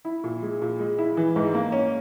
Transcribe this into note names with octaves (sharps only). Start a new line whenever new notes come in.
E4
A#2
G#3
A#2
G#3
E4
E3
G#2
A#3
C#4